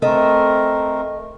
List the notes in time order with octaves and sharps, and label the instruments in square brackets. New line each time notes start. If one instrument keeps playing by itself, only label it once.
[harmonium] A3 C4 A#4 [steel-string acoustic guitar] A4 D#5 E5